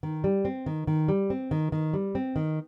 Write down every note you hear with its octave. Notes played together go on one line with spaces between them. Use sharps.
D#3
G3
C4
D#3
D#3
G3
C4
D#3
D#3
G3
C4
D#3